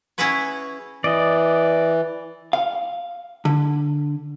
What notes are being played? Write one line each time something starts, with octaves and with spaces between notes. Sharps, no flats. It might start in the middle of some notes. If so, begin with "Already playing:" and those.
C#4 E4 F#4 G#4 B4 C#5
E3 D5 D#5
F5
D3